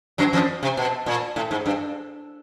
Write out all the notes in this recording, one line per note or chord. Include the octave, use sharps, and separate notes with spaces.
F#2 F#3
F2 F3
C3
B2
A#2
A2
G#2
G2